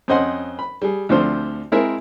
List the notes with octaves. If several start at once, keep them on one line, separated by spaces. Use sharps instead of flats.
F2 C#4 C5 D#5 F#5 C6
B5
G3 G#4
D2 D3 F3 C4 C5
G#3 C4 E4 G#4 A#4 E5